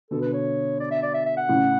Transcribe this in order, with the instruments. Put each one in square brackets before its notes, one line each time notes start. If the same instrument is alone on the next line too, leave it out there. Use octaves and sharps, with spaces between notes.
[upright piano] B2 D3 [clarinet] A4
[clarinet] B4
C#5
D5
E5
D5
E5
E5
F#5
[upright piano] A2 C#3